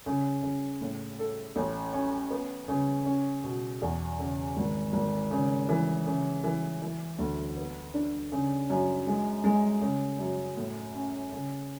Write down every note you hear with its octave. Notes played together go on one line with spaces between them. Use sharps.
C#3
C#3
A2
A4
A1
C#4
B3
C#3
C#4
B2
E2
C#3
G#1
G#1
C#3
E3
C#3
E3
E3
D2
B3
D4
C#3
F#2
G#3
G#3
C#3
F#2
A2
C#4
C#3